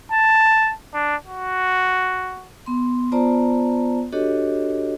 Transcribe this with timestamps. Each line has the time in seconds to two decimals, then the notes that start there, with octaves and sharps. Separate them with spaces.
0.12 A5
0.94 D4
1.26 F#4
2.66 B3 C6
3.12 B3 F4 C5 D5 A5 A#5
4.13 D4 F#4 G4 A4 C#5 D#5